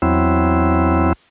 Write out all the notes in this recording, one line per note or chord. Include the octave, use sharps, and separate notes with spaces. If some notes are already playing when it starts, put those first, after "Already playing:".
E2 F#3 C4 E4